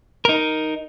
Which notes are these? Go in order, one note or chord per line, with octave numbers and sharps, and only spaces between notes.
D#4 A#4